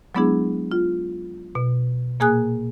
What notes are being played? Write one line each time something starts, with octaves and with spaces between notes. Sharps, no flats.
F#3 G#3 B3 D4 E4 G#4
F4
B2
A#2 A#3 G#4 G#5 D#6 F#6